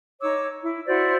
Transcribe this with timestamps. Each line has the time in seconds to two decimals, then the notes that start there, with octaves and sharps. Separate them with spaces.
0.22 D#4 C#5 D6 E6
0.63 E4
0.87 E4 F#4 C5 D5